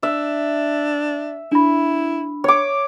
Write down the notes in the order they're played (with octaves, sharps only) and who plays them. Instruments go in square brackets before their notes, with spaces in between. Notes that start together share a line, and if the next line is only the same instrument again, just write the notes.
[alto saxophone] D4 [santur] E5
[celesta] D4 B5 [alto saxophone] E4
[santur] C#5 D6